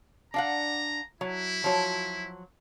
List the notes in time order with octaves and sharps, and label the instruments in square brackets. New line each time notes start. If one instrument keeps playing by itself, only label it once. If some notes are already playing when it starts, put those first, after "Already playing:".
[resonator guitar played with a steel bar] D4 F5 F#5 [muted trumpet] A#5
[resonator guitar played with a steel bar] F#3 [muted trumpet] E4
[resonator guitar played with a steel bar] F3 F#3